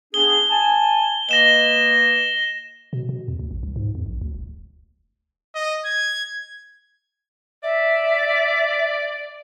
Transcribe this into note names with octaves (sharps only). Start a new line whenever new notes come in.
B3 D4 G#4 G7
G#5 A5
A#3 B4 D#5 A#6 E7 G7
B2
B2
E2
D2
A1
C2
G#2
E2
A#1
D2
D#1
D#5
G#6
D5 E5